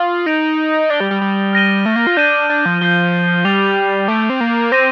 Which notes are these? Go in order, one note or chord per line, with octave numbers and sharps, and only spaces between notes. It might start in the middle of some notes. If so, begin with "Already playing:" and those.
Already playing: F4 D#6
D#4 G6 A#6 D7 F7
D4 A6 D7 G7
G3
G3
G3
F6 A#6 D#7 G7
A3
A#3
F4
D4 G6 A#6 D#7
D4
F3
F3 G6 C7 D#7 G7
G3 D6 A6 C7 F7
A3 D6 G6 D7
C4
A#3
C4 G6 A#6 D#7